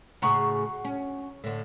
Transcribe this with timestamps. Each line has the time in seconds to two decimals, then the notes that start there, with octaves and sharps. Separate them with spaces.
0.22 A2 C#3 F#4 G#4 A#5 C#6
0.84 C#4
1.44 A2 D3